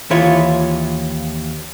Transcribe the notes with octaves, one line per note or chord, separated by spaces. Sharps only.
D#2 E3 E4 F4 C#5